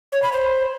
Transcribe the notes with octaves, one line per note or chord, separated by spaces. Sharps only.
C#5
B5
C5